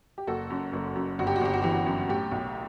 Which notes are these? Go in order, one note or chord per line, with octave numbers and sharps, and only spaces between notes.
G4
F#1 F#4 A4
F#2
F#1
F#2
G1 F#4
G4
F#4
G1 G4
F#4
E3 G4
F#4
F#2
A2 G4
B1